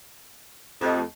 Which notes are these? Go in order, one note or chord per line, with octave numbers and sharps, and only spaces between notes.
F2 A3 G4 D#5